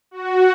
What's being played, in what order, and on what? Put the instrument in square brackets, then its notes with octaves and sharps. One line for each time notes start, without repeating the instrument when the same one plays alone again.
[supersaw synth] F#4